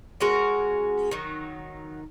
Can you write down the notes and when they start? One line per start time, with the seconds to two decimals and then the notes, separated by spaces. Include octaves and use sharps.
0.20 G#3 C#4 F#4 A#4
1.11 D#3 F#3 D#4